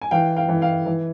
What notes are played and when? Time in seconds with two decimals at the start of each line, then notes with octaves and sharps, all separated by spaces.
0.02 G#5
0.11 E3 F5 G5
0.36 F5 G5
0.49 E3
0.61 F5 G5
0.86 E3